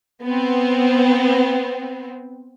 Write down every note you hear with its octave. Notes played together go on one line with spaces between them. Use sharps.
B3 C4